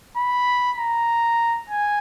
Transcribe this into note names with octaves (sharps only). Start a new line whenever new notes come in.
B5
A#5
G#5